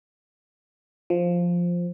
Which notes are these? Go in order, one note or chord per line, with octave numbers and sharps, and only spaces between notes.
F3